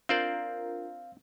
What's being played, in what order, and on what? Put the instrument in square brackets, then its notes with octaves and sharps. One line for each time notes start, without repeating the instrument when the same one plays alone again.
[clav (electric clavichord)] C4 C5 D5 [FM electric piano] D4 F4 A#4 [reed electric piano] F5